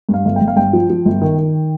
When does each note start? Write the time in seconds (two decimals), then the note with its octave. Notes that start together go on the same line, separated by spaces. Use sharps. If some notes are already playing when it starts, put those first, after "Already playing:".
0.09 G2
0.14 F5
0.25 G1
0.36 G5
0.41 G1
0.48 F5
0.56 G2 G5
0.73 F3
0.90 F3
1.05 G1
1.21 D#3
1.38 D#3